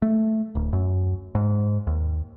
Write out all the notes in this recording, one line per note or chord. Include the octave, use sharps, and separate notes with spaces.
A3
D1
F#2
G#2
D#2